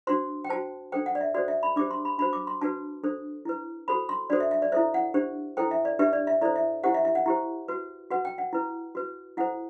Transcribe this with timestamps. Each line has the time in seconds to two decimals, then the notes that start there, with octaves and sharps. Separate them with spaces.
0.07 D4 F#4 C5 C6
0.44 G5
0.49 F#4 C5 A5
0.92 D4 A4 C5 G5
1.06 F#5
1.15 D5
1.21 E5
1.34 F#4 A4 C5 D5
1.48 E5
1.63 B5
1.76 D4 G4 C5 D6
1.91 C6
2.05 B5
2.18 D4 F#4 C5 B5
2.33 D6
2.47 C6
2.61 D4 F#4 B4 A5
3.04 D4 A4 C5
3.45 E4 B4
3.88 F#4 A4 C5 B5
4.09 C6
4.30 D4 F#4 A4 C5 D5
4.40 E5
4.51 E5
4.62 D5
4.72 E4 A4 C5 E5
4.94 F#5
5.14 D4 G4 C5
5.57 E4 A4 C5 G5
5.71 E5
5.85 D5
5.99 D4 G4 B4 E5
6.13 D5
6.27 E5
6.41 E4 A4 C5 D5
6.56 E5
6.84 E4 G4 C5 F#5
6.94 E5
7.05 E5
7.15 F#5
7.26 E4 G4 C5
7.68 F#4 B4
8.11 F#4 B4 F#5
8.25 G5
8.38 F#5
8.53 E4 B4
8.95 F#4 B4
9.37 E4 A4 C5 F#5